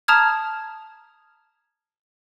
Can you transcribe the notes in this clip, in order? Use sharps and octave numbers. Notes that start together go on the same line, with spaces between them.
A5 A#5 D#6 F6 G#6